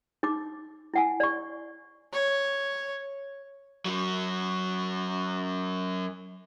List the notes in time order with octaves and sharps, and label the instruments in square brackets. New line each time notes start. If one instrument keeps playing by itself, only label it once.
[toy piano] D#4 D6
E4 F#5 G#5
D5 C#6
[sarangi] C#5
[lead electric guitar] F#2 F#3